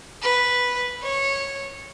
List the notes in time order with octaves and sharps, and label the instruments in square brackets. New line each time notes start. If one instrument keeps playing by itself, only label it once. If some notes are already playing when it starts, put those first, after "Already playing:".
[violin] B4
C#5